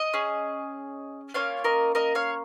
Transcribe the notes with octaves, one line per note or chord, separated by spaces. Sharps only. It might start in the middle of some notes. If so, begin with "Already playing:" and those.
Already playing: D#5
C#4 G#4
A#3 C#4 F4 C#5 F5
A#4 D#5
A#4 D#5
C#5 F5